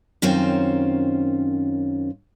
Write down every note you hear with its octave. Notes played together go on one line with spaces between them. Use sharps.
F#2 D#3 C4 C#4 F4 C5